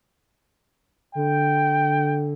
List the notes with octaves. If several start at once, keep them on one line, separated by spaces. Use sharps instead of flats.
D3 G5